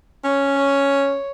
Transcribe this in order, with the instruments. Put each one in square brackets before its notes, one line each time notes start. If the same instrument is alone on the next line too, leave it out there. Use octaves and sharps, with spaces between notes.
[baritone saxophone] C#4 [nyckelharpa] C#5
[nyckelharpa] C#5